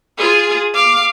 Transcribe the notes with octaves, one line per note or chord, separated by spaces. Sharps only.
F4 G#4
F5 D6